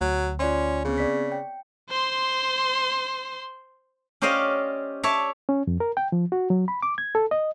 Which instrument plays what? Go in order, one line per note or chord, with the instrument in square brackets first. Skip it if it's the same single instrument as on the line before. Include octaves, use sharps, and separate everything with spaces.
[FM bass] D2 [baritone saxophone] F#3
[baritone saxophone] C#4 [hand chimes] F4 D5 C6
[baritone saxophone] C#3 [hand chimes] B3 C4 G#4
[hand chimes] C#5 D5 B6
G5
[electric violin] C5 C6
[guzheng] C#4 G4 C5 D5 D#5 F5
C#5 D5 E5 A5
[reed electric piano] C#4
F2
A#4
G5
F3
F#4
F#3
B5
D6
G#6
A4
D#5